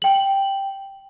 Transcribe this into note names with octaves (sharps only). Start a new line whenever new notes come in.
G5 F#7